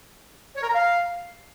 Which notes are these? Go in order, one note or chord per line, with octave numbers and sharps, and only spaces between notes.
C#5
A#4
A#5
F5